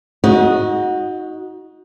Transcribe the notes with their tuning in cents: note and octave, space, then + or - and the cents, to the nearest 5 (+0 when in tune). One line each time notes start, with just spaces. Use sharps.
D#4 +30 F#4 -10 D#5 +0